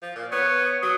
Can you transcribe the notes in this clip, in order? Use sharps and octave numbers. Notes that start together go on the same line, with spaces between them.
F3
A#2
B3 C#5
F#3 D#6